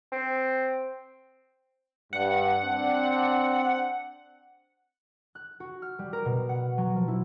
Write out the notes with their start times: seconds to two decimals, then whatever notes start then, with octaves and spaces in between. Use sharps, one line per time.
0.12 C4
2.13 G2 F#5
2.64 C4 D4
5.35 F#6
5.60 F#4
5.82 F6
5.99 G3
6.13 A#4
6.25 B2
6.49 F#5
6.78 F#3
6.96 F3
7.08 E4